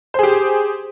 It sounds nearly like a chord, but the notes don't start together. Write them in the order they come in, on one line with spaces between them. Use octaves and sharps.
C5 G#4 G4